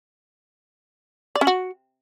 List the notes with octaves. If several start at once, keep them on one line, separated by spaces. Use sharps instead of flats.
D5
C#4
F#4